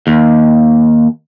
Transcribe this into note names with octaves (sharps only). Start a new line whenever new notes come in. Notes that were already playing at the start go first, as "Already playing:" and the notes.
D#2